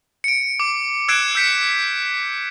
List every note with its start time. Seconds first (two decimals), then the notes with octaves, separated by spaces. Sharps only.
0.24 C#7 D7
0.60 D6
1.08 E6 F#6 G#6 C7 D7 E7
1.35 E6 G6 B6 C#7 D7